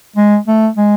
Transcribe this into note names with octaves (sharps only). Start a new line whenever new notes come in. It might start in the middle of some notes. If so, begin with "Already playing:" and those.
G#3
A3
G#3